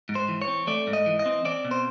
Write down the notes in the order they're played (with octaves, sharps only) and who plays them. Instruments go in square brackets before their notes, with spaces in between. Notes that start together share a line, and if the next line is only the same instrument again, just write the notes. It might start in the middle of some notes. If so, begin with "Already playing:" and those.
[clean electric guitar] G#2
C5
E3
C#5
C4
A3 D5
G#2
D#5
E3
D#5
C4
C4 D5
B2
C5